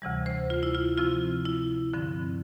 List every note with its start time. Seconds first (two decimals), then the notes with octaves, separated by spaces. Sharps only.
0.02 D2 C3 E3 G3
0.26 C5
0.50 F4
0.63 E4
0.75 F4
0.97 C3 F3 C4 F4
1.45 E4
1.93 G2 D3 F3 C4